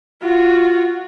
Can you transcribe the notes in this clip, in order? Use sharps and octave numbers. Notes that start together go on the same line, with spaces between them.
F4 F#4